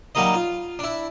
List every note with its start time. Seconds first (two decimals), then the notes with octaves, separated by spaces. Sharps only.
0.15 F#3 G3 A#3 D#4 D#5
0.34 F4
0.79 D4 E4